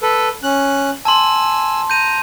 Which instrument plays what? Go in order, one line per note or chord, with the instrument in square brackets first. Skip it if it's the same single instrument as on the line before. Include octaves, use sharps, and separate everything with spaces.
[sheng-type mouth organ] A4 B4
C#4 F#6
[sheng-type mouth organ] G#5 E6 [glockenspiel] A5 C6
[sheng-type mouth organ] A#5 [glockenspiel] G6 D#7